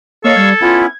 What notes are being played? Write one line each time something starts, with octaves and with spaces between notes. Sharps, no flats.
A#3 A4 C#5 D#5 F5 C#6 E6
G3 G#6
B3 C#4 E4 F4